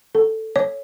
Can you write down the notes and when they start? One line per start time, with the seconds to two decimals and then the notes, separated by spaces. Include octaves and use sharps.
0.15 A4
0.56 C#5